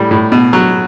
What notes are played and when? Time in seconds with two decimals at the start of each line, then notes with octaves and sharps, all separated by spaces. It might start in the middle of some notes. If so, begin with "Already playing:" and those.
Already playing: A2 G3
0.11 A2
0.32 B2
0.53 F#3